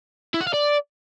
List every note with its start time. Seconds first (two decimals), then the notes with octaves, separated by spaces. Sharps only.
0.34 E4
0.41 F#5
0.47 F5
0.54 D5